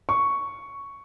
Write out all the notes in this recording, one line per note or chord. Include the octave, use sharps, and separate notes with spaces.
C#6